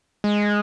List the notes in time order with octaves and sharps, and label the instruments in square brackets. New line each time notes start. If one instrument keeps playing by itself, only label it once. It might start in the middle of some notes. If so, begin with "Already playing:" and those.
[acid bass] G#3